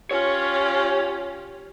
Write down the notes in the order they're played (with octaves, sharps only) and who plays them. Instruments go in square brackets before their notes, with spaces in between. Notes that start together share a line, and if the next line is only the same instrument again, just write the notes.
[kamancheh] C#4 F4 [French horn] G4 [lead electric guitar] C#5